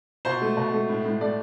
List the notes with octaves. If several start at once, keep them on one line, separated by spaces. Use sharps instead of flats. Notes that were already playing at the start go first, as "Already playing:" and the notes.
B2 C5
A3
B2
A3
A2
A2
A3 D5